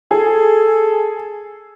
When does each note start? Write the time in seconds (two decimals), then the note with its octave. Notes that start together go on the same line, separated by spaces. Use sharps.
0.11 G#4 A4